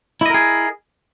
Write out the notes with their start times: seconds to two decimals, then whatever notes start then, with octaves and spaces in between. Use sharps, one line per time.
0.21 E4
0.26 D#5
0.30 A#4
0.34 G#4